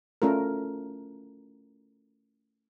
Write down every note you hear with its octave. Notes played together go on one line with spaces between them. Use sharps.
A3 C#4 F4 A4 A#4